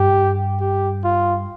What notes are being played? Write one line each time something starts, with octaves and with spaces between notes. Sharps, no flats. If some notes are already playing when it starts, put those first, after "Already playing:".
Already playing: G2 G4
G4
F4